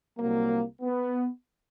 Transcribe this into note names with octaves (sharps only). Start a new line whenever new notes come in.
C2 A#2 F#3 A#3
B3